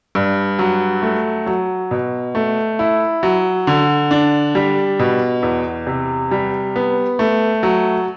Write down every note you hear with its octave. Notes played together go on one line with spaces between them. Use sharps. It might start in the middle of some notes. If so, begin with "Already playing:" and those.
G2
F#3
A3
F#3
B2
A3
E4
F#3
D3
D4
G3
B2
E2
C3
G3
B3
A3
F#3